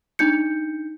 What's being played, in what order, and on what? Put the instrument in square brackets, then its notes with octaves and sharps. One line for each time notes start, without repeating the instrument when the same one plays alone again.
[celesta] D4 D#4 G6 C#7